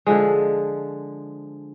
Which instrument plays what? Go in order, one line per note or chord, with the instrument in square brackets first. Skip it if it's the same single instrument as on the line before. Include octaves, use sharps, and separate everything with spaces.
[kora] D3 F3 G#3